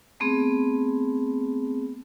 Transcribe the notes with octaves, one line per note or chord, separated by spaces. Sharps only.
A3 B3 C4 G#4